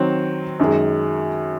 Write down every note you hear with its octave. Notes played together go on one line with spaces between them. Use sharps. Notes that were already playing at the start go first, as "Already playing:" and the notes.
Already playing: D#3 F#3 C4
F#2 D#3 G#3